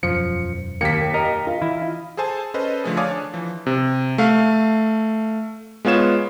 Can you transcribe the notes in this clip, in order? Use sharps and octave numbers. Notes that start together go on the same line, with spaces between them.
E1 F#2 F3 C#7
D#2 A#3 B6 C#7
A#4 D#5
F4
E3 E4
G#4 A4 C5 G#5 A5
C#4 A4 B4 C5 D#5
D3 F3 A3 G#4
C#5 D5 F5 G#5 D6 D#6
D4
E3 F3
C3
A3 F5
G#3 B3 F4 C#5 E7